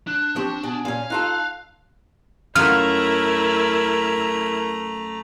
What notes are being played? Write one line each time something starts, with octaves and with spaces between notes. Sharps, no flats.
D4 F#6
F3 C4 G4 C#6
B2 G#5
A#2 C#4 F5
D#4 F4 A4 F#6
F#2 A3 E4 F4 A#4 F#5 A#5 F6